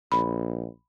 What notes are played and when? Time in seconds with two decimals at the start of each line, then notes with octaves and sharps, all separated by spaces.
0.12 A#1 B5